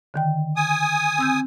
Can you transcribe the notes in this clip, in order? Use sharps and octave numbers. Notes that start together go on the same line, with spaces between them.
D3 D#3 G5
G#5 D#6
C4 E6 G6